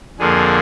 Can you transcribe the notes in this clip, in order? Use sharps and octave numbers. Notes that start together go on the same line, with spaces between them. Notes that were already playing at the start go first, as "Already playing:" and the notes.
F2 D3 F3 A#3 G#4